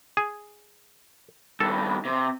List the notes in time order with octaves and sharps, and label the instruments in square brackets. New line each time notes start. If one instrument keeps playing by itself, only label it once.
[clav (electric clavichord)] G#4
[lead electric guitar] G2 D#3 [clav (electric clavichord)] A4
[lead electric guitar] C3